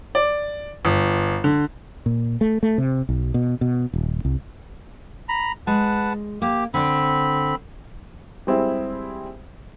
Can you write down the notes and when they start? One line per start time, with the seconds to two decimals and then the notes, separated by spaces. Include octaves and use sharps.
0.15 D5
0.85 G1
1.44 D3
2.06 A#2
2.41 A3
2.63 A3
2.78 C3
3.09 B1
3.34 B2
3.61 B2
3.93 D#1
4.25 C2
5.29 A#5 B5
5.67 G#3 B4 F#5 A5
6.42 A#3 G4
6.74 D3 C4 D4 B5
8.47 G3 G#3 C4 E4 G#4 E5